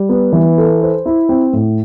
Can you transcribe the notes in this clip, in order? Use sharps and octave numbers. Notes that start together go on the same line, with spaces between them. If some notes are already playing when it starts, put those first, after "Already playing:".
Already playing: G3
B3
E3
A4
C5
E4
C4
A2